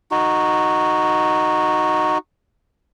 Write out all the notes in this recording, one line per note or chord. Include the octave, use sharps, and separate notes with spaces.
D#4 F#4